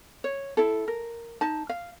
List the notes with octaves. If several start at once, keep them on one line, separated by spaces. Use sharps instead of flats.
C#5
E4 A4
A#4
D#4 A5
F5